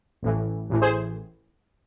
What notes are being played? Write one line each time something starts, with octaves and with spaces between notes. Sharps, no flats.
A1 A2 E3
A1 A2 E3
G#4 C5